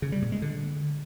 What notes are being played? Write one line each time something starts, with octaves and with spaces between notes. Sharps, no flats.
C#3
G3
A#2
G#3
D3